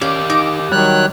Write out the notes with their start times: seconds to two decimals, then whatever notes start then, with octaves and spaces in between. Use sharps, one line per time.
0.01 C#4 G4 A#4 D5 F5
0.30 D#4 D6
0.72 D#3 F#3 G3 C#5 F#6